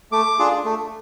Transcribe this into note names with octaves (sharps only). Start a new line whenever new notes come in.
A3 D6
D4 F4 G#4
A3